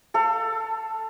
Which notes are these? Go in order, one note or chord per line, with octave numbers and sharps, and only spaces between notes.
A4 F5